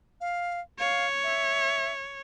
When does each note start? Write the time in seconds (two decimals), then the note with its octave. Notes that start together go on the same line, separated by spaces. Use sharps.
0.21 F5
0.80 C#5 F5
1.23 E5